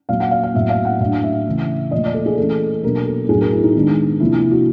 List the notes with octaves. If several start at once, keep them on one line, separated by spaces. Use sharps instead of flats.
A#2 F#3 A#3 F5
F#5
F5
F5
A2 F#3 B3 E5
F5
F#5
A2 F#3 A3 D4 F5
E5
C#3 E3 A3
A#2 F3 A3 D#5
D5
A4
G#4
E3 A3 C#4 A4
B2 F#3 A#3 D4 A#4
A4
A2 F#3 B3 D4 G#4
A#4
E4
D#4
D#3 G#3 B3 D4
C3 F3 A#3 D4 E4
E4
F#4